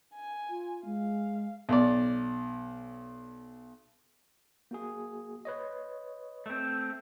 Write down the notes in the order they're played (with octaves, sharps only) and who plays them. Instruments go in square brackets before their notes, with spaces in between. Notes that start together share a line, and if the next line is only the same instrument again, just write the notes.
[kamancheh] G#5
[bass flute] F4
[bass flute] G#3 [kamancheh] F5
[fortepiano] B1 D5
[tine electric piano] A#3 F#4 G#4
B4 C#5 D#5
[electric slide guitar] A3 C4